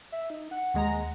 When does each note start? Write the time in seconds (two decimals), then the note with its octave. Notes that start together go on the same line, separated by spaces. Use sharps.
0.12 E5
0.30 D#4
0.51 F#5
0.74 D#2 G#3 A#5